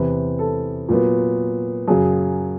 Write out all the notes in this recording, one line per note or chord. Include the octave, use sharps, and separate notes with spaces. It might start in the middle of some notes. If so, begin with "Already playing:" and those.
Already playing: E2 C3 E3 B4
A4
A#2 F#3 B3
F#2 C#3 F#3 G#4